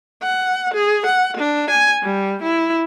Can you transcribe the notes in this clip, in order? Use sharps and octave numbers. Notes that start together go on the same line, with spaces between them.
F#5
G#4
F#5
D4
G#5
G3
E4